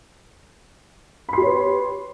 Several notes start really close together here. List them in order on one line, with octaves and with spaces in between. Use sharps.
B5 C6 G4 C#5 B4